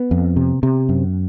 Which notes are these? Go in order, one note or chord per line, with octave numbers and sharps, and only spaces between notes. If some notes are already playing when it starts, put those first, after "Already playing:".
Already playing: B3
F2
C3
C3
F#2